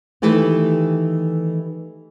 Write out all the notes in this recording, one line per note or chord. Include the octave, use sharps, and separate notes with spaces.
D#3 E3 A3 G4 B4